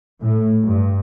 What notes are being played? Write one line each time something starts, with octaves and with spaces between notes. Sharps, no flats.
A2
G2